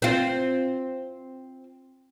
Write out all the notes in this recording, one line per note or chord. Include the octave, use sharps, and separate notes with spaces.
C4 F4